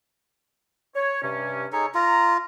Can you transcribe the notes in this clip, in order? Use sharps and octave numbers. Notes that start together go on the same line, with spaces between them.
C#5
G2 C3 C#4
D#4 G#4 A4 C#5
F4 A#5